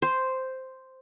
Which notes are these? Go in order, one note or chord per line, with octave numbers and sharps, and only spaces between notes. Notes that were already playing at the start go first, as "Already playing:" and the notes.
C5